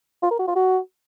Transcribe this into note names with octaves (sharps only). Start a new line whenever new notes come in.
F4
A#4
F#4
F4
F#4